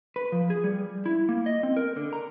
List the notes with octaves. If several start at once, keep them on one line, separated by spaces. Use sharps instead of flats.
B4
F3
G#4
G3
E4
A#3
D#5
C4
A#4
D3
A#5